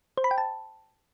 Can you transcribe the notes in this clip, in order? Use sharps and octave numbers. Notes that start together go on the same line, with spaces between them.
C5
B5
G5
A5